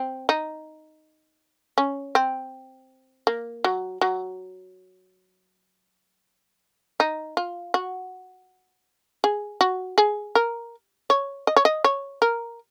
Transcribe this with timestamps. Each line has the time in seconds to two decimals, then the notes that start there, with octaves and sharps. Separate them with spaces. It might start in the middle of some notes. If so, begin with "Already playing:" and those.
Already playing: C4
0.29 D#4
1.78 C#4
2.15 C4
3.27 A#3
3.64 F#3
4.01 F#3
7.00 D#4
7.37 F4
7.74 F#4
9.24 G#4
9.61 F#4
9.98 G#4
10.35 A#4
11.10 C#5
11.47 D#5
11.56 C#5
11.65 D#5
11.84 C#5
12.22 A#4